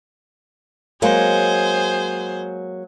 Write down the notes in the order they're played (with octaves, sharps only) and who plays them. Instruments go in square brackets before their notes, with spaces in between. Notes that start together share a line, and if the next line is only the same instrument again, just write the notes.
[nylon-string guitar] F#3 G#3 A#3 [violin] G#4 C5